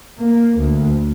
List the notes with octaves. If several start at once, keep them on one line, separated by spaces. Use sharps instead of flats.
A#3
D2